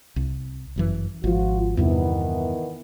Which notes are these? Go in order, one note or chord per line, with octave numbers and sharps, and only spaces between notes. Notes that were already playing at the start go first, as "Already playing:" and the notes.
C2
G1 F#2 E3
G#1 F3 F4 F#4
E2 G2 C3 D#3 E3 B3